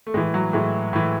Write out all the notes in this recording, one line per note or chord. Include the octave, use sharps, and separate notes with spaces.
A3
A2 E3 G#3
F#3
A2 E3 G#3
A2 E3